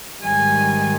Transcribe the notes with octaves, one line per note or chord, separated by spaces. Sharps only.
G#2 D#3 G3 G#5